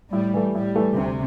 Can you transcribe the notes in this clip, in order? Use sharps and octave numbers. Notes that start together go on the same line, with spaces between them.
A2 G3
E3 A3
A2 G3
E3 A3
D2 C3